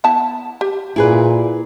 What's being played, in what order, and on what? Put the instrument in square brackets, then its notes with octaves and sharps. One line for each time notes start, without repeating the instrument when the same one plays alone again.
[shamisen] B3 E4 A5
G4
[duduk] A#2 [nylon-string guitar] E4 G#4 B4